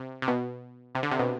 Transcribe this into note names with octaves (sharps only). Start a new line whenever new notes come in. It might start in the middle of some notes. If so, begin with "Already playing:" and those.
Already playing: C3
C3
B2
C3
D3
C3
B2